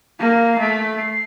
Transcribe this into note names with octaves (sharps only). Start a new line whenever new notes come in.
A#3 A#6
C7
A3 B6
C7